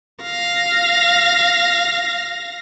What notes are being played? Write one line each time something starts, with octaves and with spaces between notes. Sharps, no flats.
F5 A#6